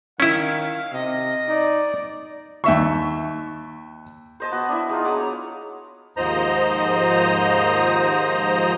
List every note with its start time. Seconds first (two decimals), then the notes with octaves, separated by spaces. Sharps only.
0.20 D#3 C#4 E4 F5
0.93 C3 D#5
1.48 D#4 D5
2.64 D#2 E5 C#6
4.40 C5 D#5 A5
4.52 B3 F#4
4.69 D4 E4
4.89 G#3 D#4 F4
5.05 F#3 G#4 F#5 D6
5.20 C#5
6.17 D#2 G#2 F3 C5 D#5 A#5